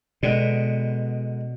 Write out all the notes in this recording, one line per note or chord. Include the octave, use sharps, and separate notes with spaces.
B2 D3 G#3 B3